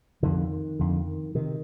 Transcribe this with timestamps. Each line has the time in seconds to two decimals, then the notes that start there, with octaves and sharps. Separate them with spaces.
0.23 F2 D3 D#3
0.79 F2 D3
1.35 C3 D#3